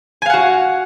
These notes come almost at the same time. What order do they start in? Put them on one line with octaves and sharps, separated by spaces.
G#5 F5 F#5 F#4